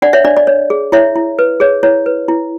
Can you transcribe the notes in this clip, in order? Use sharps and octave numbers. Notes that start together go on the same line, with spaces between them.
D4 D5 F#5
C#5 E5
D4 D5
D5
C#5
G#4
E4 C#5 E5
E4
B4
G#4 C#5
E4 C#5
B4
E4